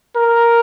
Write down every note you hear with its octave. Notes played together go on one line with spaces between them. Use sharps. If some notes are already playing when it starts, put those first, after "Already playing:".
A#4